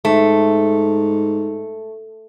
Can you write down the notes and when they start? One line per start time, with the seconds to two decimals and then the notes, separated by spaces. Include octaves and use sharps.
0.05 G#2 A3